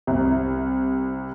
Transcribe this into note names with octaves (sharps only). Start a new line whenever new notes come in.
C2